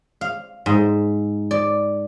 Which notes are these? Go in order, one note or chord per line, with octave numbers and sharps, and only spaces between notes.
F5
G#2
D5